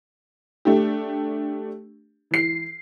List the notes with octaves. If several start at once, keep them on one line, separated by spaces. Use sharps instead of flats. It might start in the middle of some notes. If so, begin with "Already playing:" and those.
A3 D4 G4
E3 C7